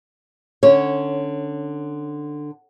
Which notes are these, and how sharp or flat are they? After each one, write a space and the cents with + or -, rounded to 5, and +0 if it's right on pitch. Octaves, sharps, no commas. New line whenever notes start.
D3 +15 C#4 +0 C#5 +0